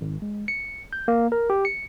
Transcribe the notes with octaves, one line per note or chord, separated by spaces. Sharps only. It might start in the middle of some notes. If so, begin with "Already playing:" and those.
G#1
G#3
C#7
G6
A#3
A#4
G4
C#7